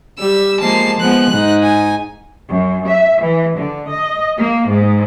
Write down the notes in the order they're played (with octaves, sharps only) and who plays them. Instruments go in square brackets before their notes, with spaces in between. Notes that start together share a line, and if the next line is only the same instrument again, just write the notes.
[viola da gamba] G3 [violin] E6
[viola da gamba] F3 G#3 A#3 [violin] A5 C7
[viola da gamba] F3 G#3 B3 [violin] F#6
[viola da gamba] G#2 D#4
[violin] G#5
[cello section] F#2
E5
E3
D3
D#5
A#3
G#2